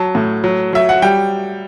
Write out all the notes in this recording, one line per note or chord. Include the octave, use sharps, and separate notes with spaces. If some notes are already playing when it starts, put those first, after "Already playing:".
Already playing: F#3 A5
A2
F#3
F#3 E5
F#5
G3 G5